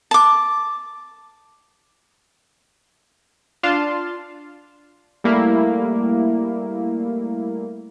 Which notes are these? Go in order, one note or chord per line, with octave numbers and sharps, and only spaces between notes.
A5 D6
D4 F4 F5 A5 C6
G3 A3 A#3 E4